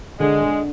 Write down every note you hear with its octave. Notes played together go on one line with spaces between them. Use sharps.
D3 G#3
D3